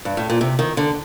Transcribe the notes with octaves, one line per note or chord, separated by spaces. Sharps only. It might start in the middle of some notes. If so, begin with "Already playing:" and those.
G2
A2
A#2
C3
D#3
D3